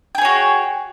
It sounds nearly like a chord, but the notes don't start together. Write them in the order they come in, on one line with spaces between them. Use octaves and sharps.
G5 G#4 C#5 F#4